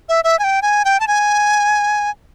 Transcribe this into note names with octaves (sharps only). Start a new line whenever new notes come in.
E5
E5
G#5
G5
G#5
G5
A5
G#5